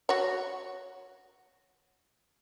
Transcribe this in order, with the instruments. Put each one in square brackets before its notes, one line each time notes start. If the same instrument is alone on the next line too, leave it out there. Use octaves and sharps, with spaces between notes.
[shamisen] F#4 C#5